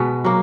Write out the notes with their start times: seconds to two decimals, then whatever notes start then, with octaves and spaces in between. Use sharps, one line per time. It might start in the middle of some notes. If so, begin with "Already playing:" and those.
Already playing: B2 G#3 B3
0.24 F#3 A#3